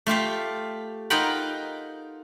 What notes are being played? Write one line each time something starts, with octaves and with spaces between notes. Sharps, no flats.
A3 F4 G4 F5
D#4 F4 A#4 F#5 G5 B5